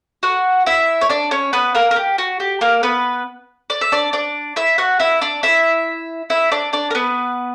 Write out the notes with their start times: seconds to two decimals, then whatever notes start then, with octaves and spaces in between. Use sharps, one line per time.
0.23 F#4 F#5
0.66 E4 E5
1.01 C#5
1.09 D4 D5
1.31 C#4 C#5
1.53 B3 B4
1.75 A#3 A#4
1.91 A#4
1.96 G4
2.18 F#4
2.40 G4
2.61 A#3 A#4
2.83 B3 B4
3.70 D5
3.81 E5
3.92 D4 D5
4.13 D4 D5
4.56 E4 E5
4.78 F#4 F#5
5.00 E4 E5
5.21 D4 D5
5.43 E4 E5
6.30 E4 E5
6.52 D4 D5
6.73 D4 D5
6.91 A#4
6.95 B3 B4